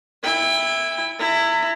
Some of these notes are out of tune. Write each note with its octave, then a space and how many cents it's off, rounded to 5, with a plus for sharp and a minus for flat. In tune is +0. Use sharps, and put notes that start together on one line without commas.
E4 +0 G5 +35
E4 +10 A#5 -35